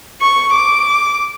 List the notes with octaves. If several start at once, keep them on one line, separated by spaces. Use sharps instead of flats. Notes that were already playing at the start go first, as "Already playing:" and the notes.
C#6
D6